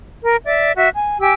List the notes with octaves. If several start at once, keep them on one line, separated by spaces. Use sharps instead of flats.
A#4
D5 E5
F#4 E5
G#5
G4 G#5 E6